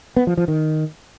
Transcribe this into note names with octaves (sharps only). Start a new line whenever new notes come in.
B3
F3
F3
D#3